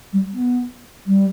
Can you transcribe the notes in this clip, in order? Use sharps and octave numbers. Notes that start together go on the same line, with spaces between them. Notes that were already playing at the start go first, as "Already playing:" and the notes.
G3
B3
G3